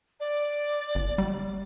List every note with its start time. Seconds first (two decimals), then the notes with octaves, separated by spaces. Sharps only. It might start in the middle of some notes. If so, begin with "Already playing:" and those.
0.20 D5
0.95 G1
1.18 G3